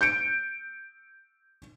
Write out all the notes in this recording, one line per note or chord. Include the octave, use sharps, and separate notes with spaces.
G6 C#7 D7